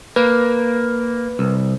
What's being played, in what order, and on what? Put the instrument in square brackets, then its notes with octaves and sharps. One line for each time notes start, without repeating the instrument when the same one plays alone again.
[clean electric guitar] A#3 [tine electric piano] B4
[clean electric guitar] C2